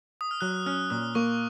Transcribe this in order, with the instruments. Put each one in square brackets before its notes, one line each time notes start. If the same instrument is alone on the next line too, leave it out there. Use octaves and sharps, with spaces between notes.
[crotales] D#6
F6
[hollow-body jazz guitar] F#3 [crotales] F#6
[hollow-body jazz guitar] C#4 [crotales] F6
[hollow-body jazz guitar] A#2 [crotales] D#6
[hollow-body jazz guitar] A#3 [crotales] C#6